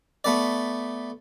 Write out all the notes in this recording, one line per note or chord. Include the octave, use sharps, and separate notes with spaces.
A3 B3 D5